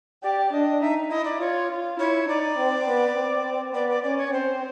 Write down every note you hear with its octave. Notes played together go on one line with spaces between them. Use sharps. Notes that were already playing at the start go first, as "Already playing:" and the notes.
G4 D5
D5
D4 D#5
D#4 E5
E4 D#5
D5
F4 C#5
F4
E4 C#5
D#4 D5
C4
B3
C4
B3 D5
D5
C#4 D5
C#5
C4 C5